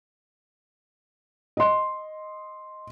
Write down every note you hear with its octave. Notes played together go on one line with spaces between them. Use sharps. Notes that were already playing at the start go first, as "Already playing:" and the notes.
D#5 C6